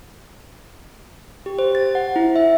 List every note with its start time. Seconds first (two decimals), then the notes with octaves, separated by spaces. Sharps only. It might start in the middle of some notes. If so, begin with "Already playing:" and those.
1.46 G4
1.59 C5
1.75 A6
1.95 F#5
2.16 E4
2.36 E5